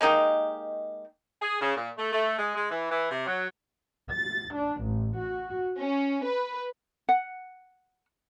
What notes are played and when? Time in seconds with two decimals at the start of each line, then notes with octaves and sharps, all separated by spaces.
0.01 G#3 A#3 D#4 G4
1.41 G#4
1.61 C#3
1.76 A#2
1.97 A3
2.13 A3
2.38 G#3
2.55 G#3
2.71 E3
2.90 E3
3.10 C3
3.27 F#3
4.12 A6
4.54 D4
4.83 A1
5.17 F#4
5.79 C#4
6.25 B4
7.09 F#5